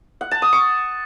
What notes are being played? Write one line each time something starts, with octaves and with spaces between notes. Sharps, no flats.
F#5
A5
D#6
C#6